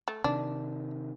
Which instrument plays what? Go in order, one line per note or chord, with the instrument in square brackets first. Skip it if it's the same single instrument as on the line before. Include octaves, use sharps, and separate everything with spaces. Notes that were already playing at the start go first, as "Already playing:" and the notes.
[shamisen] A3
[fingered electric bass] C3 D#3 [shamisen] D4